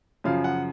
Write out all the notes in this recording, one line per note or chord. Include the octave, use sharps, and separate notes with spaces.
F#2 C#3 F3 F5
F#5